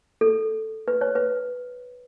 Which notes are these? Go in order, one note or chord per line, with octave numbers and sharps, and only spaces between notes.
A4
B4
C#5
B4